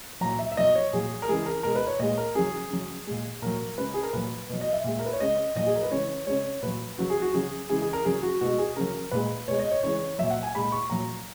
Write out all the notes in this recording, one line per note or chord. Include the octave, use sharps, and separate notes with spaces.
A#2 F#3 A#5
E5
E5
B2 F#3 D#5
C#5
A#2 F#3 G#4
A#4
C#3 E3 G#3 G#4
A#4
B2 G#3 A#4
B4
C#5
A#2 G#3 D#5
A#4
C#3 F#3 G#4
C#3 F#3
A#2 G#3
A#2 F#3 A#4
C#3 G#3 B4
G#4
A#4
A#2 F#3 B4
B2 F#3
D#5
E5
A#2 G#3
A#4
B4
C#5
C#3 G#3 D#5
A#2 F#3 D#5
G#4
A#4
B4
C#3 E3 G#3 C#5
C#3 G#3 C#5
A#2 F#3 B4
C#3 F#3 F#4
G#4
F#4
C#3 F#3 G#4
C#3 E3 G#3 G#4
G#4
A#4
C#3 F#3 G#4
F#4
B2 G#3 F#4
G#4
C#3 F#3 A#4
A#2 G#3 B4
B2 G#3 C#5
D#5
C#5
C#3 E3 G#3 C#5
A#2 F#3 E5
F#5
G#5
A#2 G#3 B5
C#6
A#2 F#3 A#5